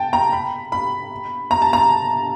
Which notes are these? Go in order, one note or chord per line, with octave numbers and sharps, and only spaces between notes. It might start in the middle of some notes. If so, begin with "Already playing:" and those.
Already playing: G5 A5
A#5
B5
B5
A#5
A5
A#5